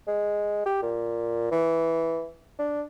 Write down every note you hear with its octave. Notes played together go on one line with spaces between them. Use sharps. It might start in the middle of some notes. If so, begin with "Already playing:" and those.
G#3
G4
A#2
E3
D4